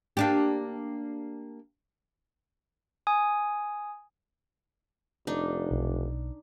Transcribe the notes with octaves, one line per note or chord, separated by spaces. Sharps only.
A#3 D4 G4
G#5 D#6
F1 D4 D#4
B1